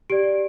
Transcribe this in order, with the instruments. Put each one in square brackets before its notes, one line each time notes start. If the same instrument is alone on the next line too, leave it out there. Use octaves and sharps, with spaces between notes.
[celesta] G4 D5 D7